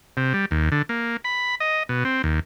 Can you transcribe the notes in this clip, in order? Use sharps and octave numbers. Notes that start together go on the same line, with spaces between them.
C3
G3
D#2
D3
A#3
B5
D#5
B2
C4
D#2